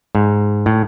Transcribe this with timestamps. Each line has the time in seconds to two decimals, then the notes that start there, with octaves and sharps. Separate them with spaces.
0.15 G#2
0.66 A2